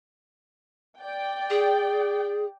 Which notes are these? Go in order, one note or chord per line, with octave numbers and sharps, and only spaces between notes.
D5 G5
G#4